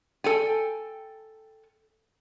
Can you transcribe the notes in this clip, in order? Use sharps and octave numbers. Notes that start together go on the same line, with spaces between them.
A4 G5 G#5